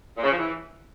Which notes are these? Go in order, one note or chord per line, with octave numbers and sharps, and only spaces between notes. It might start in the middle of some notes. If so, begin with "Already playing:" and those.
A#2
C#3
F3
E3